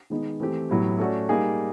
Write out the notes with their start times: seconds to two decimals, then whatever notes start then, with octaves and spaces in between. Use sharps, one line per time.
0.10 D#3 G#3 B3 D#4
0.40 E3 A3 C4 E4 G4
0.70 A2 F#3 B3 E4 G4
0.99 A3 C#4 F#4 A4 D5
1.29 G3 A#3 D#4 G#4